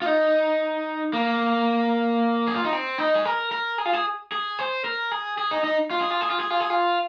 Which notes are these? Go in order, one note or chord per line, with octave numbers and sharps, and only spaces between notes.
F4
D#4
A#3
G#4
F4
D#4
C4
D#4
G#4
A#4
A#4
G#4
F4
G#4
G#4
C5
A#4
G#4
G#4
D#4
D#4
F4
G#4
F4
G#4
F4
G#4
F4
G#4
F4